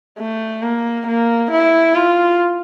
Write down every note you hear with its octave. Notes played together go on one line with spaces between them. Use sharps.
A3
A#3
A#3
E4
F4